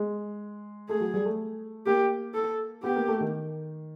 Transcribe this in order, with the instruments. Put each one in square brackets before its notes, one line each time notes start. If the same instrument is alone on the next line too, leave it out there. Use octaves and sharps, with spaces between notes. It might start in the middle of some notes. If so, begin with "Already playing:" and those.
Already playing: [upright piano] G#3
[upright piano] A3 [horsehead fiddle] G#4
[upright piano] F#3
G3
A3
[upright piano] A#3 [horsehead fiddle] G4
[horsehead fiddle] A4
[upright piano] B3 [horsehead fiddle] G4
[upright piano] A#3
A3
D#3